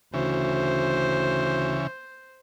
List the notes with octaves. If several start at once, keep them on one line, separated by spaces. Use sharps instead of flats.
D2 C#3 E3 C5